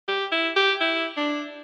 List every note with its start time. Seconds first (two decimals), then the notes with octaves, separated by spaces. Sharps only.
0.08 G4
0.32 E4
0.56 G4
0.81 E4
1.17 D4